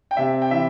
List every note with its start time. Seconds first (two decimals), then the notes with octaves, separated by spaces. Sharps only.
0.11 G5
0.17 C3 E5
0.42 G5
0.51 E3 E5